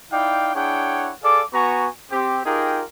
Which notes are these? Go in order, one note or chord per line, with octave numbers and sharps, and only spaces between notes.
D#4 E4 D5 F5 G5
D4 E4 G#4 C#5 F#5 G5
G#4 A4 D5 F5 D6
B3 F#4 G#5 A#5 C#6
C4 G4
D#4 F4 G4 G#4 A#4 G5